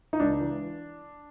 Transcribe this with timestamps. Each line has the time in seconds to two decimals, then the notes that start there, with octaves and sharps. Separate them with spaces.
0.13 D#4
0.20 C#2 D4
0.41 E3